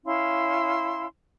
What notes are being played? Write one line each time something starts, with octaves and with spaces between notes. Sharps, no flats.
C#4 E4 F5 C6